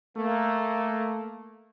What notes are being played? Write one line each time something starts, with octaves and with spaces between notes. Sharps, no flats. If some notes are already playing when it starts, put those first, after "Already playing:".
A3 A#3